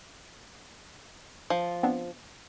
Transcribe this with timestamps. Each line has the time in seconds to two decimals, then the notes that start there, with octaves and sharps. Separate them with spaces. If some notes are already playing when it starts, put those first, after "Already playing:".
1.50 F3
1.83 B3 C4 D4